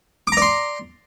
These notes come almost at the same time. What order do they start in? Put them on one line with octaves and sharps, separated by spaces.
D6 A#5 D5 C6